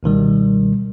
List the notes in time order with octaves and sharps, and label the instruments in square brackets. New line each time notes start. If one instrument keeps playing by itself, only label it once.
[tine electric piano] C#2 B2 D#3 G3